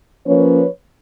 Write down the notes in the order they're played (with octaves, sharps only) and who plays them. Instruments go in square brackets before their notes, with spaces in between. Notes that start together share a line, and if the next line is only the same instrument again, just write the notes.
[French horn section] F3 A#3 C#4 B4 C#5